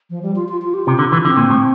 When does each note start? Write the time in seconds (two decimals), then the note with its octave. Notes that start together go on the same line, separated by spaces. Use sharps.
0.10 F3
0.23 G3
0.36 F4
0.48 F4
0.62 F4
0.74 G4
0.87 C3 F4
0.99 D3
1.12 E3
1.25 D3 C4
1.37 A#2
1.50 A2